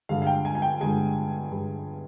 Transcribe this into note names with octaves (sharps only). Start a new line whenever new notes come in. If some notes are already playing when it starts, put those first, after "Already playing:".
G2 D3 G#3 F5
F5
G5
G#5
G#5
G5
G2 D3 G#3 G#5
G2 D3 G#3